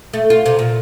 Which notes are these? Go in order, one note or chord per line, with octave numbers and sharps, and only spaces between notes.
A3
F4
C3
A#2